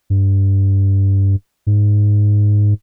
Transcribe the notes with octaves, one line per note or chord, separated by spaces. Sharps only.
G2
G#2